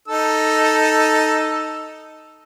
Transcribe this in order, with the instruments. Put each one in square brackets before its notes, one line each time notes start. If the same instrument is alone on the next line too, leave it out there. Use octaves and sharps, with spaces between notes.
[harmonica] D#4 A4 E6